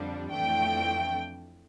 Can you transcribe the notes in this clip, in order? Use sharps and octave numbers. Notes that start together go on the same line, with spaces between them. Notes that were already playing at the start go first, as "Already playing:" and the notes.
Already playing: F2 D3 G3 D4
F2 E3 A3 D4 G5